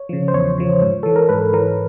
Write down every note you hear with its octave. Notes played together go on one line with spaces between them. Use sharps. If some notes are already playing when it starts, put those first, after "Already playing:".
Already playing: C#5
C#3 F3
C5
E2 C#5
C#3 F3
G#2
E3 A4
A#4
G#2 B4
E3 A#4